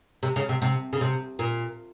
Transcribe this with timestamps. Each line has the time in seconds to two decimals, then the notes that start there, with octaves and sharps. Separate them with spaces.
0.23 C3
0.36 C#3
0.49 C3
0.62 C3
0.93 C#3
1.01 C3
1.39 A#2